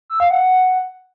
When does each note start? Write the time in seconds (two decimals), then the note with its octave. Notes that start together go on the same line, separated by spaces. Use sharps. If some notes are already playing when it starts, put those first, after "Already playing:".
0.10 E6
0.20 F5
0.30 F#5